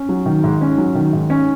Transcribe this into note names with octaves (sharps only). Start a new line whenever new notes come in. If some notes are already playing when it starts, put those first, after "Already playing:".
Already playing: C#4
F#3
D#3
G#2
C#4
F#3
D#3
G#2
C#4